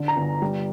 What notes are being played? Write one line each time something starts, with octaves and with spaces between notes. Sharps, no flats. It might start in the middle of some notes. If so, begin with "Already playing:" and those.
Already playing: D3
A#5
G1
G3